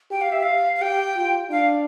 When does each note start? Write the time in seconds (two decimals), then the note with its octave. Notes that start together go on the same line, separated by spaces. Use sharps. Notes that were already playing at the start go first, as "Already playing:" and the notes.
0.11 G4 G5
0.21 F5
0.32 E5
0.42 F5
0.76 F5
0.81 G4 G5
1.16 F4
1.51 D4 F5